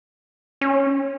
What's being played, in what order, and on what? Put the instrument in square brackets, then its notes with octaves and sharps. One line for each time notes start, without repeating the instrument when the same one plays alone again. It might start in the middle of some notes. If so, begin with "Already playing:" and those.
[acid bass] C#4